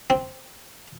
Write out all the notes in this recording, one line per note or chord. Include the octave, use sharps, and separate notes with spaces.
C4